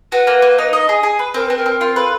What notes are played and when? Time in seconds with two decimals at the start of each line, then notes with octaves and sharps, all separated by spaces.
0.12 F#4 B4
0.27 A#3
0.42 A#3
0.58 D#4
0.73 D#5
0.89 G#4
1.03 G#4
1.19 B4
1.34 C4 A#4
1.46 C4 B4
1.57 A#4
1.66 C4
1.81 F4
1.95 A4 B4